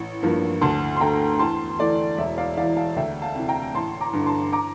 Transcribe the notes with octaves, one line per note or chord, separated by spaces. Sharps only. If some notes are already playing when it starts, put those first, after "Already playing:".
Already playing: A1
G2 F3 A#3
D2 A5 C6
C6
D3 A3 G5 A#5
E2 A5 C6
E3 A3 D5
E1 E5
D5 F5
E2 E3 D5 F5
F5 A5
D2 E5 G5
F5 A5
C3 E3
G5 A#5
A1 A5 C6
A#5 D6
G2 D3
A5 C6
A#5 D6